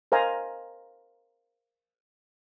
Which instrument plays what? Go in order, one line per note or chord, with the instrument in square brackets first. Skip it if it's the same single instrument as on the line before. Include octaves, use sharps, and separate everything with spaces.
[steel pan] A#4 C5 D#5 F5 G#5 A#5